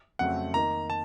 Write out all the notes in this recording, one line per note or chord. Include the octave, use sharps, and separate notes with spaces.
F2 C#3 F#3 A3 C4 F#5
D#3 A#3 D#4 A#5
A5